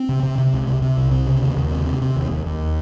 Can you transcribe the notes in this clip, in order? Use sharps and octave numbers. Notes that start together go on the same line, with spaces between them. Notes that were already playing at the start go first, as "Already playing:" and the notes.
Already playing: C4
C3
C3
C3
C#2
C3
C3
C2
C3
C#3
D#2
D#2
C3
C3
C3
D#2
D#2
D#2